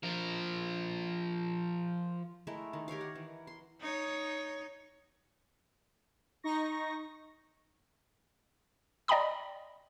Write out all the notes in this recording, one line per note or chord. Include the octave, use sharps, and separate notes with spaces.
F3 A#4
G#3 A3 E4 A#4
D#3
G4 A#4 C#5 F5
F#5
E3
C6
D#4 C#5
D#4 C#6 A#6
D5 D#5 G5 A#5 B5 D#6